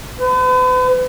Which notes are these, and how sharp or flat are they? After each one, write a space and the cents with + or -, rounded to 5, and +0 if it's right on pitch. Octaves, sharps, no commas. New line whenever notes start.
B4 +45